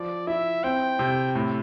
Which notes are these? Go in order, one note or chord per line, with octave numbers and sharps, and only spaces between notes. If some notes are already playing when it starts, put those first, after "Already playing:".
Already playing: F3 D5
E4 E5
C4 G5
C3
A2